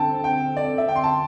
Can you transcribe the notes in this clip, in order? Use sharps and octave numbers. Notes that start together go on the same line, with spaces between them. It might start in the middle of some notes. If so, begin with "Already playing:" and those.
Already playing: D3 C4 A4 G5 A5
G5
D5
E5
G5
C6
A5